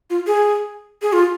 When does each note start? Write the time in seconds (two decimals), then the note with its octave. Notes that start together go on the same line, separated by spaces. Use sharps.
0.10 F4
0.27 G#4
1.02 G#4
1.13 F4